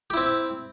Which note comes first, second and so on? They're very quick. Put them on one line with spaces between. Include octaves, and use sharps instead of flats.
G4 E4 C4